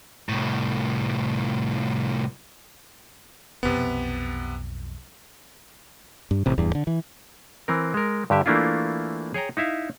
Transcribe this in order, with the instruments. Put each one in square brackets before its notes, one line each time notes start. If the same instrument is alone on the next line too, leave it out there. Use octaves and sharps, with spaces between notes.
[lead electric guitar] C2 A2
[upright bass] B1 F2 [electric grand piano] C3 B3
[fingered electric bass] G2
A1 C3
D1 E2 G2
D3
E3
[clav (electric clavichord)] E3 C4 A#4
G#3 A#4
G2 D3 G4 E5
E3 A3 A#3 D4 E4 F4
G#4 C#5 G5 A#5
D#4 E4 E5 F5